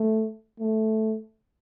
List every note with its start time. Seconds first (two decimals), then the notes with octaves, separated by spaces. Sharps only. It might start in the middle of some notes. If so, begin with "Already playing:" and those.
Already playing: A3
0.60 A3